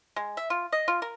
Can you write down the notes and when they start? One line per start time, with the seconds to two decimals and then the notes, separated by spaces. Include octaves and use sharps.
0.16 G#3
0.37 E5
0.50 F4
0.72 D#5
0.88 F4
1.02 A#4